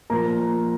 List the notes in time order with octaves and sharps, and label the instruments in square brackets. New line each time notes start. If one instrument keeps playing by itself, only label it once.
[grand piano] A#2 F3 A#4 A#5